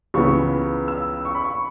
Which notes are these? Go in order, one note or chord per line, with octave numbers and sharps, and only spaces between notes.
C#2 C#3 E3 B3 C#6
E6
C#6
B5
C#6